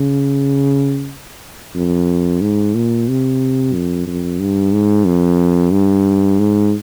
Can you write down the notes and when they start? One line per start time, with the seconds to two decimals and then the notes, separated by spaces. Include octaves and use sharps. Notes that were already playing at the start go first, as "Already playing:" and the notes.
Already playing: C#3
1.75 F2
2.42 G#2
2.75 A#2
3.08 C3
3.74 F2
4.07 F2
4.40 G2
4.74 G#2
5.06 F2
5.72 G2
6.39 G#2